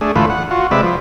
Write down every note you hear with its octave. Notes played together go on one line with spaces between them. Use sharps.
A3 D4 G#4
D2 A2 E3 A3 F4 B4
F#5
F4 F#4
C3 G#3 B4 D5 E5
F3